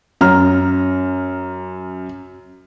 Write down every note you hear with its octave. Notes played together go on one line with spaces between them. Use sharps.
F#2 A#5 F6